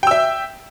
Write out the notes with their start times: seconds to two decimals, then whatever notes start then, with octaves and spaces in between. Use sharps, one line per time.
0.03 G5
0.07 E6
0.11 E5